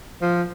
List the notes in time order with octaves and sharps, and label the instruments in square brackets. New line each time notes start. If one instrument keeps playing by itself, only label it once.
[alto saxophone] F3